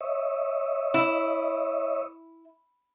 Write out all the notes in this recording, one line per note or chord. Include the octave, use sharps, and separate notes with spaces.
C#5 D#5 E5
E4